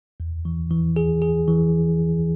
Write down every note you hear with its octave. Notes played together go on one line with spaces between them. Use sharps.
E2
E3
E3
G#4
G#4
E3